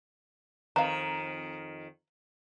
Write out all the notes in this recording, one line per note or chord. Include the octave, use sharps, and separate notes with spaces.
F2 D#3 B4 D#5 F5 A#5